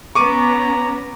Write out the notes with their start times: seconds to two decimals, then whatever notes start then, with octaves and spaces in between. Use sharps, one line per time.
0.15 B3 C#4 A#5 C#6 D6 D#7